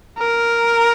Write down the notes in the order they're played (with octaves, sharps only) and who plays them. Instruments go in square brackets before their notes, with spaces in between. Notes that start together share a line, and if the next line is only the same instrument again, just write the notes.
[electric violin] A#4